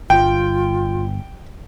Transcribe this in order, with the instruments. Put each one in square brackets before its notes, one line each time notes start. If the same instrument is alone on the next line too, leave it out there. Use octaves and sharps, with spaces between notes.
[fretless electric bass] G1 [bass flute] F4 [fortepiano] G5